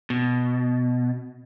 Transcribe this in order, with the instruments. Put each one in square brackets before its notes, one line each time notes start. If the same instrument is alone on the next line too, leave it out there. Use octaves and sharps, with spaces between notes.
[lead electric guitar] B2